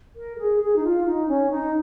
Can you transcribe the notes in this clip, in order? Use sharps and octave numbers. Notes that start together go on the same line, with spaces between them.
A#4
G#4
G#4
D#4
F4
D#4
C#4
D#4